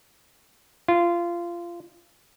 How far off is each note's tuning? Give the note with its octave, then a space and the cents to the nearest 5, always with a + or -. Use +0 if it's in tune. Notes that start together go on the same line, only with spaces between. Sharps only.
F4 -20